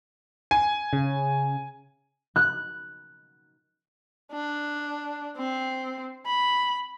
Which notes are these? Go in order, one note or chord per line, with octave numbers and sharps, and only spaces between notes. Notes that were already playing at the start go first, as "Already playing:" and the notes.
G#5
C#3
F#6
D4
C4
B5